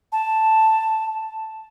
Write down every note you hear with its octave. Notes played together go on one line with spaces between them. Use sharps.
A5